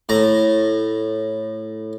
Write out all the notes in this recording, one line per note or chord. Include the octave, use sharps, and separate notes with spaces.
A2 A#5